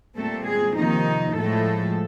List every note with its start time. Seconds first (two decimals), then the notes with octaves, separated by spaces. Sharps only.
0.16 A#2 G3 A3 C4 A4
0.46 G#3 G#4
0.76 C3 D#3 F3 A#3 D#4
1.36 A2 F3 G#3 A3 A4